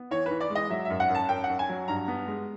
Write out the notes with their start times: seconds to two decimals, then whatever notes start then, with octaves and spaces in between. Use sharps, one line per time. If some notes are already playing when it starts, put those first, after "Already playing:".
Already playing: B3
0.11 E3 C#5
0.26 E3 B4
0.40 D5
0.50 G#3
0.55 D#5
0.70 F#3 E5
0.85 F#2 E5
1.00 F#5
1.09 F#2
1.15 A5
1.29 F#2 G5
1.44 F#5
1.50 F#2
1.59 G#5
1.69 F#3
1.88 G2 A#5
2.08 B3
2.28 G#3